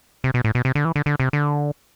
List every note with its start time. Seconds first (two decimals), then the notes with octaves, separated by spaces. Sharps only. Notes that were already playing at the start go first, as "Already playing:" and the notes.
0.24 C3
0.34 B2
0.44 A2
0.55 B2
0.65 C3
0.75 D3
0.85 E3
0.96 D3
1.06 D3
1.20 C3
1.33 D3